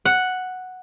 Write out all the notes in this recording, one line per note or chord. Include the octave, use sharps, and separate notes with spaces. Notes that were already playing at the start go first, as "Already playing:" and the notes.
F#5